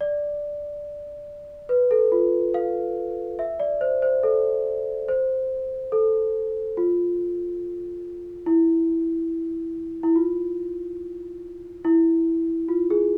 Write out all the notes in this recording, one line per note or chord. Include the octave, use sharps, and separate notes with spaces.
D5
B4
A4
F4
F5
E5
D5
C5
C5
A4
C5
A4
F4
E4
E4
F4
E4
F4
G#4